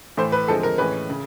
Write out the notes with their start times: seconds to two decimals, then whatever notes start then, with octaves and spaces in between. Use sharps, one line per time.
0.17 A2 E3 A3 C5
0.32 B4
0.48 D3 F3 G#3 C4 A4
0.63 A#4
0.78 A2 E3 G#3 C#4 B4
1.10 C#3